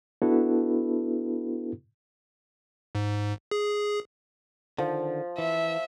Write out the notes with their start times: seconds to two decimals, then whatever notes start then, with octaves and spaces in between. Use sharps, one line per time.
0.22 B3 D4 E4 F#4 A4 B4
2.95 G#2
3.51 G#4
4.79 D3 D#3 F3
5.39 E3 E5